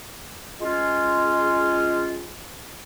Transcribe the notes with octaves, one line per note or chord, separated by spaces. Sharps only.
G#3 C#4 F4